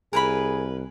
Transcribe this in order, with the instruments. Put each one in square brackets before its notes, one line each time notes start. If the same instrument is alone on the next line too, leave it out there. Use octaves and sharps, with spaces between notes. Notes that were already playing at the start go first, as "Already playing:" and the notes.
[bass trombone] C2 [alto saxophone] G#4 [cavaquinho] A#4 B4 B5